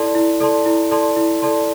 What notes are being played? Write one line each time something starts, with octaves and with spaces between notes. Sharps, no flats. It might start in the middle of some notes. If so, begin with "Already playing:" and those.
Already playing: E4 A4 D5 A5 C6
E4
A4 D5 A5 C6
E4
A4 D5 A5 C6
E4
A4 D5 A5 C6